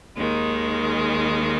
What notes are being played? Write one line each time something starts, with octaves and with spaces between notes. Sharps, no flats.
D#2 D#3 G#3